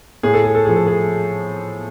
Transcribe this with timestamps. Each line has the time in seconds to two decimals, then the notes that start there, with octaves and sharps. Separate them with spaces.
0.23 A2 G#4
0.34 A4
0.44 G#4
0.55 A4
0.65 F3 G#4
0.76 A4
0.87 G#4